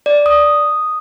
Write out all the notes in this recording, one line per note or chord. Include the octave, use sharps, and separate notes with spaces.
D5
D#6